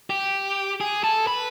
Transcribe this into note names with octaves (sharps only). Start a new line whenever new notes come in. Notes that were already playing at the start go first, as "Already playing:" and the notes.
G4
G#4
A4
B4